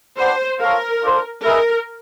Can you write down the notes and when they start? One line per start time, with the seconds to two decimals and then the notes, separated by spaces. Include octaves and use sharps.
0.18 D4 G4 B4 C5 D5 F#5
0.60 F4 A4 A#4 C#5 F5
1.03 D4 F4 A4 C5
1.45 D#4 G#4 A#4 B4 E5